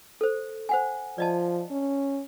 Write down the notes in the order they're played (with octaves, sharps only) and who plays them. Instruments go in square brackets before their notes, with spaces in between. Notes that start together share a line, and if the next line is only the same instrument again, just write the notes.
[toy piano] A4 C5
C5 F#5 G#5
[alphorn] F3 [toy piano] D5 D#5 A5
[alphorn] C#4